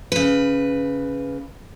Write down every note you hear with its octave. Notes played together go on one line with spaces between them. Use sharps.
C#3 B4